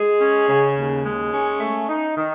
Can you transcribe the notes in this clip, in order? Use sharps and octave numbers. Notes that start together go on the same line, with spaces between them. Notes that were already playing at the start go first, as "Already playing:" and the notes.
Already playing: G#3 G#4
C#4
C#3
D#2
G#3
C#4
A3
D#4
D#3